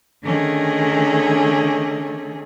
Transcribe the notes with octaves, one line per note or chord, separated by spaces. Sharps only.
D3 D#3 A3 C#4 G#4